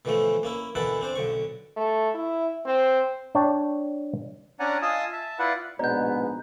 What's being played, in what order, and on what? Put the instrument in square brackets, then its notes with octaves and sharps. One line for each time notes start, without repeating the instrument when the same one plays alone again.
[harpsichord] B2 D3 E3 F3 A3
A#3 C#4 E4
B2 D3 E3 E4 F#5 A5
C4 D4 C5
B1 D3 C#6
[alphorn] A3
E4
C4
[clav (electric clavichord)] D4 C#5 G5 A5
[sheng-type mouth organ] C#4 D4 D5 F#5 G#5 A#5
F4 D#5 G#5 A5 D#6 E6
E5 A5
E4 F4 B4 D5 F#5
[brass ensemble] A#1 G#2 B2 [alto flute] B3 [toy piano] D5 D#5 [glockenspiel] A#5 G6